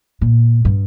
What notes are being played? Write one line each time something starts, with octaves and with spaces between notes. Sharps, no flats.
A#2
G2